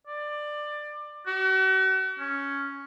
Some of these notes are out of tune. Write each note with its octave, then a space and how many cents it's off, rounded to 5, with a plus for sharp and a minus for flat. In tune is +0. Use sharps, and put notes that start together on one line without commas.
D5 +20
F#4 +40
C#4 +5